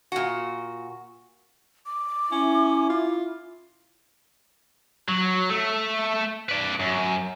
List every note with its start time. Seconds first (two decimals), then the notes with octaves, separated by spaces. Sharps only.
0.12 A#2 F#4
1.86 D6
2.31 C#4 E4
2.89 F4
5.08 F#3
5.50 A3
6.49 B4 D5
6.80 F#2